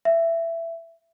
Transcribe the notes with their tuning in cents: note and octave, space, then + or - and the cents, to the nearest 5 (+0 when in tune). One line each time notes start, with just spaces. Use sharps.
E5 +15